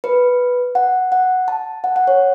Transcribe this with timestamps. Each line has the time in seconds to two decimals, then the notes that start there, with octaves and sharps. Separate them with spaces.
0.04 B4
0.75 F#5
1.12 F#5
1.48 A5
1.84 F#5
1.96 F#5
2.07 C#5